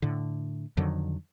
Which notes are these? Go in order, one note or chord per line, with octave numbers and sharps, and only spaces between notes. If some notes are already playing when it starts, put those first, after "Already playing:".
A2 D3
F2 D3 D#3 F#3